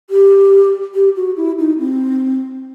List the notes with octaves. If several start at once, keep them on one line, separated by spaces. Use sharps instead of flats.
G4
G4
F#4
E4
D#4
C4